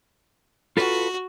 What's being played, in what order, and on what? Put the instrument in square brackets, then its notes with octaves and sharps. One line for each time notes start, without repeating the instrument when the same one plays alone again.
[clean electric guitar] F4 A4 B4 [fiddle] F#4